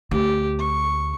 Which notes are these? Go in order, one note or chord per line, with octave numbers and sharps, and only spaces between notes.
D2 G4
C#6